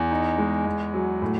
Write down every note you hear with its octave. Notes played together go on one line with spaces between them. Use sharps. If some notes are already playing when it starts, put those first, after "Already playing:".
Already playing: E2
D#4
G#3
E2
F#3
A2